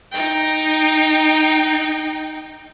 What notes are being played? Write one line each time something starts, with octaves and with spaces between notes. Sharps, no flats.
D#4 G5